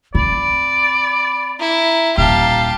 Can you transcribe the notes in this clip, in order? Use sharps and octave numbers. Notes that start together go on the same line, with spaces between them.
C4 D5 B5
E4 A#5
D#1 G4 F5 A5